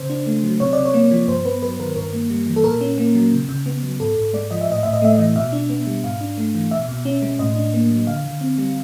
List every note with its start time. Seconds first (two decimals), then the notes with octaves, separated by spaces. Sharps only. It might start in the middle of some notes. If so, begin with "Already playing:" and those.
Already playing: C#3 C5
0.10 D4
0.26 A3
0.44 F#3
0.60 C3 C#5
0.73 C3 D5
0.85 C#5
0.94 A#3
1.11 F3
1.28 G2 C5
1.45 B3 B4
1.62 F#3 B4
1.80 D#3 A#4
1.96 G2 A#4
2.13 A#3
2.30 G3
2.47 E3
2.56 A4
2.64 A#2 A#4
2.81 C#4
2.98 A#3
3.15 F#3
3.32 C#3
3.49 C#3
3.66 B3
3.83 F#3
4.00 G#2 A4
4.16 G#2
4.33 G#3 D5
4.51 F3 D#5
4.61 E5
4.68 A2 D#5
4.83 A2 E5
4.93 D#5
5.02 A3 E5
5.15 E3 D#5
5.36 B2 E5
5.53 D4
5.69 B3
5.87 G3
6.04 G#2 F5
6.21 D4
6.38 A3
6.55 E3
6.71 B2 E5
6.88 B2
7.05 C#4
7.22 G#3
7.39 A2 D#5
7.56 D4
7.74 A#3
7.90 F#3
8.07 D3 F5
8.24 D3
8.41 C4
8.58 G3